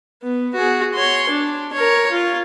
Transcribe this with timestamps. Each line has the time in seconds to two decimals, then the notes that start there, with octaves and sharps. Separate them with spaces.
0.23 B3
0.54 F#4 G#4
0.94 C#5 C6
1.29 D4
1.73 A#4 C#5
2.10 F4